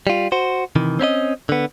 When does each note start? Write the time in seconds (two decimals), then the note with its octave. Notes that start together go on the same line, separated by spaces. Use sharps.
0.07 G3 F4
0.32 F#4 C5
0.76 C3 D#3 E3
0.99 C4 C#4 E4 D#5
1.49 D3 B3